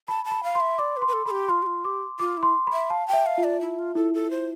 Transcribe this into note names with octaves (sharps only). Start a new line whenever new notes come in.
A5 B5
A5
B5
F5
C6
E5
D5 D6
B4
C6
B4
A4
A4 B5
G4
F4 C6
G4
F4
G4 D6
F4 D6
E4
C6
B5
E5
F5 A5
G5
E5
F5
F4
D5
E4
F4
E4 A4
A4
C5